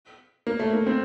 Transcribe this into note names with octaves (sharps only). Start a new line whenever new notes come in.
A#3
A3
A#3
C4